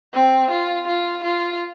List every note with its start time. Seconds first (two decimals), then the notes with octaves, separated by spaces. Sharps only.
0.14 C4
0.51 F4
0.87 F4
1.24 F4